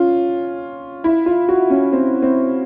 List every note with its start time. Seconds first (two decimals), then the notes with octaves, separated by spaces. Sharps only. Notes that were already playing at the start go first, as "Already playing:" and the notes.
Already playing: C#4 F4
1.04 E4
1.26 F4
1.48 F#4
1.70 C#4
1.92 C4
2.22 C4